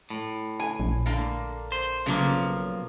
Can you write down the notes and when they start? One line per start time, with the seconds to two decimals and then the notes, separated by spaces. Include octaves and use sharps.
0.10 A2
0.60 G#5
0.80 A#1
1.06 D3 A#3
1.72 C5
2.06 B1 C#3 F3 A#3